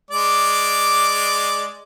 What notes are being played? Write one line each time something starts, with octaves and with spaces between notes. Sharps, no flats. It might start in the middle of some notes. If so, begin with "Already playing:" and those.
G#3 D5 D6